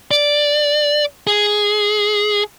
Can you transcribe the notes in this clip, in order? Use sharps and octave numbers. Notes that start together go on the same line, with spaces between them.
D5
G#4